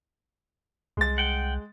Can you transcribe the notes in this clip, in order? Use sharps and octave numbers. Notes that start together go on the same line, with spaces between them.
C2 G#3 A6
F#5 G5